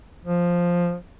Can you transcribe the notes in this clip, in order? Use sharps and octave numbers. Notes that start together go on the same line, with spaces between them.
F3